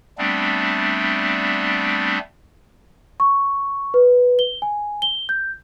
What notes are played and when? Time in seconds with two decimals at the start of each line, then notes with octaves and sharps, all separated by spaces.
0.18 G3 A3 B3 C4 D4
3.20 C#6
3.94 B4
4.39 G7
4.62 G#5
5.02 G7
5.29 G6